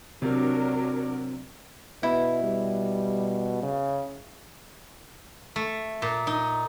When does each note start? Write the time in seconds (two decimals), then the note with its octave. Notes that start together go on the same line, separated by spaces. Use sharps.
0.22 C3 F#3 D4 A#4
2.03 B2 B3 E4
2.43 G3
3.62 C#3
5.56 A3
6.02 A#2
6.27 D#4